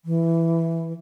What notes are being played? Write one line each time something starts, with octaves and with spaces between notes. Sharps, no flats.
E3